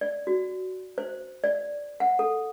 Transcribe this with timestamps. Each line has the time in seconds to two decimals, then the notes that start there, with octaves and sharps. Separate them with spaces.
0.01 D5
0.27 F#4
0.98 C5
1.44 D5
2.00 F#5
2.19 A4